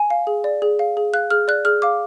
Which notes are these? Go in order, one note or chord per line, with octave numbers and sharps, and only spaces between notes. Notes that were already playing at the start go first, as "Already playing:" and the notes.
Already playing: G#5
F5
G#4
D5
G#4
F5
G#4
F5 F#6
G#4 F6
D5 F#6
G#4 F6
F5 D6